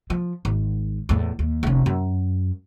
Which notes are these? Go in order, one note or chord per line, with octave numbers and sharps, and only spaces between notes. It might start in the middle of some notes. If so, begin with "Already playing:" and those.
F3
G#1
E2 A2
D#2
F1 C#4
F#2